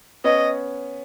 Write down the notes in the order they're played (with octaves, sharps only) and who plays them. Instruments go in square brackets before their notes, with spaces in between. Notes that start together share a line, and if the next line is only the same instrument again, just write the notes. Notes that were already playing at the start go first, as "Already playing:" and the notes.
[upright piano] B3 C#4 [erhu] D#5